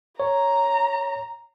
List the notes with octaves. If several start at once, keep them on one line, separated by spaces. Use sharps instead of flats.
C#5 A#5